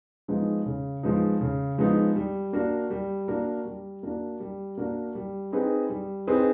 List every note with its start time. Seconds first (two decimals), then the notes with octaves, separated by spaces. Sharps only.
0.28 F3 G#3 B3 D#4
0.66 C#3
1.03 F3 G#3 B3 D#4
1.41 C#3
1.78 F3 G#3 B3 D#4
2.16 G3
2.53 A#3 D4 F#4 A#4
2.90 G3
3.28 A#3 D4 F#4 A#4
3.65 G3
4.03 A#3 D4 F#4 A#4
4.40 G3
4.78 A#3 D4 F#4 A#4
5.15 G3
5.52 C4 D#4 G#4 B4
5.90 G3
6.27 C4 D#4 G#4 B4